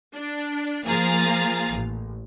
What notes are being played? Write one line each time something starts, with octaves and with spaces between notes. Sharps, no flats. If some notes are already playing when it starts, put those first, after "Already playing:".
D4
F3 A#3 G#4 F5 A#5 A6
A1